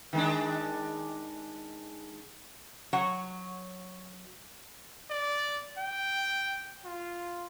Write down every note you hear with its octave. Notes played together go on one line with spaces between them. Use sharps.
D#3 G#3 D4
F#3 C#5 F#5
D5
G5
F4